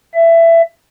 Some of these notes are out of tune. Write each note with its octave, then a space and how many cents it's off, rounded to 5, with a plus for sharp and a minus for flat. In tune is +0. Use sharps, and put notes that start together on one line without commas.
E5 +20